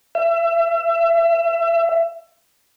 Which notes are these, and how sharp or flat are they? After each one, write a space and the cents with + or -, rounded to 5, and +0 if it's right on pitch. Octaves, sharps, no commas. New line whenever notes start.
E5 +30